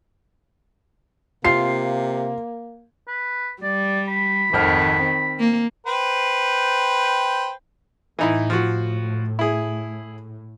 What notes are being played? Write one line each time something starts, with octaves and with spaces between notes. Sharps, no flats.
C3 A#3 F4 C7
B4
G3 D5
B5
G#1 F2 D#3 F6
C4
A#3
B4 C5 G5
A2 E3 D#4 E4
F3 F#4
E4 G#4